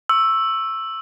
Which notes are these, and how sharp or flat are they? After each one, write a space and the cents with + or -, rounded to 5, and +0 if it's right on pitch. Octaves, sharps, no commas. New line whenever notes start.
C#6 -20 E6 +0